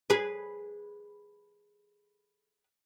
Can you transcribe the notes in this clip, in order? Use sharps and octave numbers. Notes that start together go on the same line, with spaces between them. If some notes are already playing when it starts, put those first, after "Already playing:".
G#4 B4